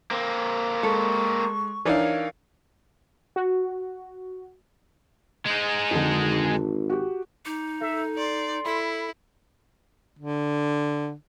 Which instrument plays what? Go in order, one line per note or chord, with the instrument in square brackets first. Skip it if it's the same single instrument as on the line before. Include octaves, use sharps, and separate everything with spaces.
[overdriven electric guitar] A#3 C4
[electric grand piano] G#3 [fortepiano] A4 [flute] C#6
[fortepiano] E3 D4 D#4 [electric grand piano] A#4 C#5 F5
[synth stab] F#4
[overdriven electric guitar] G#3 D#4
[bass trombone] G#1 [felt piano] F2 D3
[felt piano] F#4 G4
[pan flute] D#4 [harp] D6
[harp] A4 G6 A#6 [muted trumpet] E5
[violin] D5 [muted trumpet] C6
[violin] E4 [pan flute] A4 [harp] B5
[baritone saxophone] D3